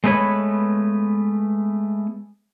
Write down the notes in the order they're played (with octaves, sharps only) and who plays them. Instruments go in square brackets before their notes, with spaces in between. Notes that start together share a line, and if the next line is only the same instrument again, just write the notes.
[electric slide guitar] G#3 A3 B3 B4 C#5